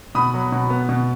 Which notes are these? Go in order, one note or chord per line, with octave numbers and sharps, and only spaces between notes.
B2 B5 D#6
F#3
B2
B3
B2